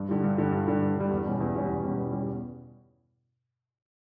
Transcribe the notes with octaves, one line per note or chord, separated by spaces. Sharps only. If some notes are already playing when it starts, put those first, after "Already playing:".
Already playing: G2
D3 G3
G2
D3 G3
G2
D3 G3
G2
D3 G3
E2
B2 G3 C#4
E2
B2 G3 C#4
E2
B2 G3 C#4
E2
B2 G3 C#4